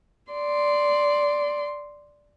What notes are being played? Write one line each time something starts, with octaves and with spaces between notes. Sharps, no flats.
D5 C6